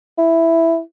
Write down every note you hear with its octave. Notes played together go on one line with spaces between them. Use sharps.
E4